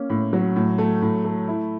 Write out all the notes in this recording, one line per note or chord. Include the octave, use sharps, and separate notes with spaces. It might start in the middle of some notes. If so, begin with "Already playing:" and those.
Already playing: A#3 C#4
A2
F#3
A2
A3
A2
A3
E4